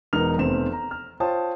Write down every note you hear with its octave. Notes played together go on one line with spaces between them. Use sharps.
E1 B3 D#4 A#4 F6 F7
F1 B3 C4 E7
A#5
F6
F4 C5 C#5 G5 A5 D#6